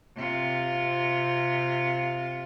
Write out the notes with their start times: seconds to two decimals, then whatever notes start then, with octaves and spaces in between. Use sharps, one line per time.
0.16 C3 F4